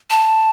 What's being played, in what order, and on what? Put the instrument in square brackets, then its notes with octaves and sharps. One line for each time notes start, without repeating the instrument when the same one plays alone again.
[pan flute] A5